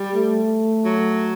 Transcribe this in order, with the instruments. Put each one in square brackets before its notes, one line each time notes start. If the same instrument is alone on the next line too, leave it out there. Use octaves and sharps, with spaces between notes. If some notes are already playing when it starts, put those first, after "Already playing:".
Already playing: [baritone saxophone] G3
[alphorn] A3
[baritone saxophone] F#3